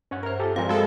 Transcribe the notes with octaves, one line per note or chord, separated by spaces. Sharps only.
G2 C#4 C#5 F#5
A#4 C5 E5 A#5 F6
F4 G4 A4 G#5
F3 G#3 C4 F4 A#4 C5 D5 F5
G#3 F#4 A4 E5 G5